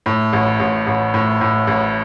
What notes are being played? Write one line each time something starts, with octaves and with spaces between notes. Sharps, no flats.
A2
A1
A1
A1
A2
A2
A1